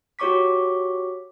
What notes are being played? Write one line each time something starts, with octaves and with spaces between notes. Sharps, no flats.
F#4 G4 C#5 C#6 D6 B6